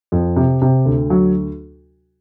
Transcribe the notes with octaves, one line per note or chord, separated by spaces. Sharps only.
F2
C3
C3
D2
F#3